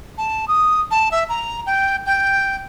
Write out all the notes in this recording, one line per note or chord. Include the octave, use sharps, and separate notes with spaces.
A5
D#6
A5
E5
A#5
G5
G5